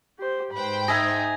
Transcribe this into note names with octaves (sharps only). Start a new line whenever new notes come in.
G4 C5
G#2 B4 C5 G5 B5
D#4 G#4 E5 G#5 D#6 G#6 A#6